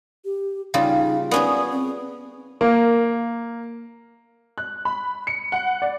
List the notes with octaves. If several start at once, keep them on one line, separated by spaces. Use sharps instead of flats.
G4
C#3 G3 D#4 F4
B3 C#4 G#4 D5
C4
A#3
F#6
B5
C#7
F#5
D5